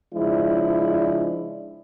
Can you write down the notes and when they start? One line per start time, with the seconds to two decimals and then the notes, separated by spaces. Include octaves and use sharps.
0.13 C#3 F3 G#3 D4 E4